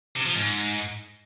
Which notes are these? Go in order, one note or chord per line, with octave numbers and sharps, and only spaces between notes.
C3
F3
G#2